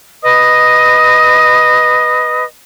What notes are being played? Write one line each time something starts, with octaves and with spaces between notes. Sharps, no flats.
B4 D#5 D#6